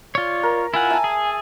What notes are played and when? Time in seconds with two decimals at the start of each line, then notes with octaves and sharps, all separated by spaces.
0.15 F4 C#5 D5
0.43 A#4
0.74 E4 F4 F#5 G#5
0.90 E5 A5
1.04 G#4